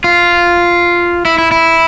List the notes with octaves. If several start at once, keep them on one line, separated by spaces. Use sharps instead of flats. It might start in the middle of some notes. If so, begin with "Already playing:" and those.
F4
E4
E4
E4